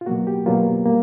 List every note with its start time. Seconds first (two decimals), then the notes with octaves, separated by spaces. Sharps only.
0.01 F4
0.06 B2 F#3 A#3 F#4
0.27 G4
0.46 B2 F#3 A#3 F4
0.86 G3 A#3